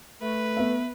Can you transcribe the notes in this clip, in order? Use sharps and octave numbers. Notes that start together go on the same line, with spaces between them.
A3 B4
B3 E5